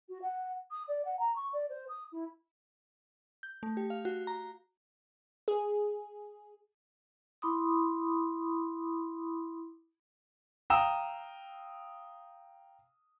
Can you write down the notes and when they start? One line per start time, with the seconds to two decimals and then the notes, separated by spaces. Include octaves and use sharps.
0.08 F#4
0.22 F#5
0.71 D#6
0.88 D5
1.05 F#5
1.19 A#5
1.35 C#6
1.53 D5
1.69 C5
1.88 D#6
2.12 E4
3.43 G6
3.63 A3
3.77 G4
3.90 F5
4.05 F#4
4.27 A#5
5.48 G#4
7.42 E4 B5 C6 D6 D#6
10.70 F5 G5 A#5 D#6 E6 E7